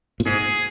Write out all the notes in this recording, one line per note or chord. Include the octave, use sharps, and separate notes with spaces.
A#2
G#2 G#4